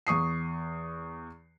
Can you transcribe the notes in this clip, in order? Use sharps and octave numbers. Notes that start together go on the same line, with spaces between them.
E2 C#6 D#6 C7